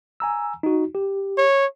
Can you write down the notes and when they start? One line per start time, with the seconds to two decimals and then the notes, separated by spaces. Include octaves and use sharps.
0.20 G#5 A#5 E6
0.63 D#4 F#4
0.95 G4
1.38 C#5